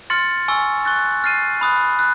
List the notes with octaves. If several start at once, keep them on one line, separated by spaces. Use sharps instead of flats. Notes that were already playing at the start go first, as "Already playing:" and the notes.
C6 F6 A6 C#7
G#5 C#6 E6
C#6 F#6 A6
F6 A6 C7 D#7
B5 D#6 F#6
F#6